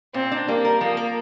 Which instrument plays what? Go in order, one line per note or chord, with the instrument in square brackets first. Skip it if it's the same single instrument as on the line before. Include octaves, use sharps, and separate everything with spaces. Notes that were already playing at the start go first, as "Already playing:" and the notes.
[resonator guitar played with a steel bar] A#2 [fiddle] C4
[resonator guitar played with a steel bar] D4
[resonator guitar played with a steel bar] G3 [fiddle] A#3
[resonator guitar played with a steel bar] A#4
[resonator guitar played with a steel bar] F3 [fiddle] A#3
[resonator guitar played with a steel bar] A#4